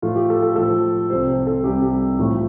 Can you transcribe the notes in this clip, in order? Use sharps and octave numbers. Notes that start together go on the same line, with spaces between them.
A2 F3 A3 F4
G4
A4
A4
A2 F3 A3 A4
C2 C3 G3 C5
C5
A4
C2 C3 G3 G4
A2 F3 A3